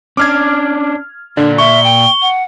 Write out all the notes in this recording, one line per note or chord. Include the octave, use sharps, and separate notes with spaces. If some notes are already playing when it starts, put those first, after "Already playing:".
C#4 D4 D6 F6 G#6
A#2 D3 D4 D5
E5 C#6 G7
G5
F#5